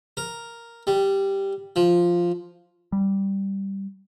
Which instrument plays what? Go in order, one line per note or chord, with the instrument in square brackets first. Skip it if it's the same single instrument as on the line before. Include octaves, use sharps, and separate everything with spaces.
[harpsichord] A#4
G3
F3
[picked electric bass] G3